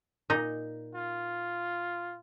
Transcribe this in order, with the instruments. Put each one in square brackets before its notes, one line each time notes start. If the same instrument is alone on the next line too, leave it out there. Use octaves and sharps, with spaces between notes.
[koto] A#2 D#4
[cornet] F4